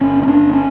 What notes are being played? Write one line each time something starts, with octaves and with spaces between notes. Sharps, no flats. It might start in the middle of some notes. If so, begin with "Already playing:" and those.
G1 C#4
C#4
G1 D4
C#4